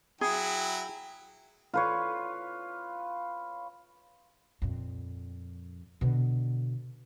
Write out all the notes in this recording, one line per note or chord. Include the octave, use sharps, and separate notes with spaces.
F#3 E4 G#4 G5
F4 B4 C#5
F2 A#2
B2 D3